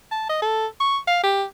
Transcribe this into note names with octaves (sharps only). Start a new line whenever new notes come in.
A5
D#5
A4
C#6
F5
G4